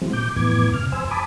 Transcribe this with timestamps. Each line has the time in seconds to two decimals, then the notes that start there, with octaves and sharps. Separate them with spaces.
0.02 E3 F#3 G#3 C4
0.13 A#2 D6 G6
0.36 F2 A2 E3 B3 D6 G#6
0.74 C3 F6
0.92 F2 C5 G#5 E6
1.11 G#5 A5 B5 D6 D#6